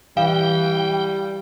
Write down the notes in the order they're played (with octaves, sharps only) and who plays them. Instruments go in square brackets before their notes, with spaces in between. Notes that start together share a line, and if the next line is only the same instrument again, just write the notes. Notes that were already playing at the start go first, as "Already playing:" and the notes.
[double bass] E3 [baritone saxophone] G3 [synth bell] F5 [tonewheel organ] G5